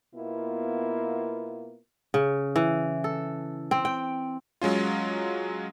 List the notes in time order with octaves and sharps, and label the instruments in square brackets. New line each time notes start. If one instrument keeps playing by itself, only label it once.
[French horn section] B2 A#3 B3 E4 F4
[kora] C#3
E3
A4
C4
G5
[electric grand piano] F#3 G#3 C#4 F4